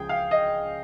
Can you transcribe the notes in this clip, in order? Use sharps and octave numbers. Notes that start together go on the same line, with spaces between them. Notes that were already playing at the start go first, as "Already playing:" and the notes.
Already playing: C#2 C#3 F3 G#4 G5
F5
D#5